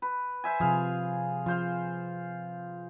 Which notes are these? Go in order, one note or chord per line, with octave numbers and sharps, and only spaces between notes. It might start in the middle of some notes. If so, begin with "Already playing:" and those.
B4
C5 E5 G#5
C3 F3 F4 G#4 F5
F3 F4 C5 F5